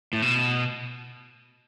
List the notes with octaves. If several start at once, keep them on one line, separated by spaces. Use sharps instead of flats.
A2
B2